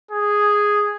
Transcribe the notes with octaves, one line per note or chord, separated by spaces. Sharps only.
G#4